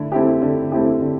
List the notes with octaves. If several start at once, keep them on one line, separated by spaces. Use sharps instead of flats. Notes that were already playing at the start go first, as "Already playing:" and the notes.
Already playing: D3 A3 E4
A3 C4 E4 G4
D3
A3 C4 E4 G4
D3